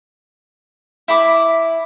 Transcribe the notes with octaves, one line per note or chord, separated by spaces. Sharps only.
E4 B5 D6